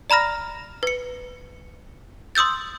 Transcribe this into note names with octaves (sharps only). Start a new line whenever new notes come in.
D5 A#5 B5 F6 A#6
B4 C#7
C6 D#6 E6 G6 A6